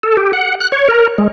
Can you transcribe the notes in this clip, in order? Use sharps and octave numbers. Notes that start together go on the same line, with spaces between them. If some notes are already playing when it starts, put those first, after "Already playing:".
A4
G4
F#5
F#6
C#5
A#4
G#3